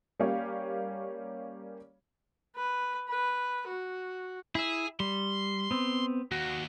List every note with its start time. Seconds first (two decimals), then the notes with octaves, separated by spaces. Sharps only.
0.19 G3 A#3 C#4 G4 C#5 F5
2.57 B4
3.09 B4
3.69 F#4
4.55 E4 G#4 E5
5.00 G3 C6
5.71 B3 C4
6.32 D#2 F#4